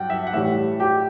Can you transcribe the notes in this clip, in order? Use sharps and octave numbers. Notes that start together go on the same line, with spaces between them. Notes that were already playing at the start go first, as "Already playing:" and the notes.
Already playing: G2 F#3 F#5 G5
E5
F#5
A2 E3 G3 E5
G4